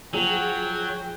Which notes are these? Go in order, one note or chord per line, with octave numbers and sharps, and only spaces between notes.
F3 F#3 G#4 G5 D#7